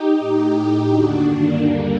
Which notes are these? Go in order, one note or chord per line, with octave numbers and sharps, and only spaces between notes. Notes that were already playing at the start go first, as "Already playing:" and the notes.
Already playing: D#4 G4
A2
A2
D#2 D3 D4 F#4
G2 D#3 A#3 D4
D#2 D3 G3 A#3